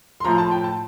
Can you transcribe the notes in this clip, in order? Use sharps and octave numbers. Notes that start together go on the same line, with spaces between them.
C6
A2 F3 A#5
A5
G5
A5